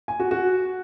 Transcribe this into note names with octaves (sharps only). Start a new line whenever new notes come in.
G#5
F#4
F#4